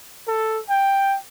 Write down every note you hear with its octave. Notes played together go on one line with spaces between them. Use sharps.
A4
G5